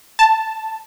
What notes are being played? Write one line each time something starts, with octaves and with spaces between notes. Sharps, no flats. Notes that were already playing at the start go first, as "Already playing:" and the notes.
A5